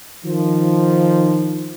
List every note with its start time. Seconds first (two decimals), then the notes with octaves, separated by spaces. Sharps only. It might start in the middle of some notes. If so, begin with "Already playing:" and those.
0.24 D#3 F3